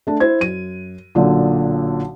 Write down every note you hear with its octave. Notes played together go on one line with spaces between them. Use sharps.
A3 D4
E4 C5 G#6
F#2 D#7
B1 A#2 D3